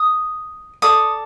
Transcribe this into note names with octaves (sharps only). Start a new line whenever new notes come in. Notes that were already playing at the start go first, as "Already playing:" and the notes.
Already playing: D#6
A4 D5 D#6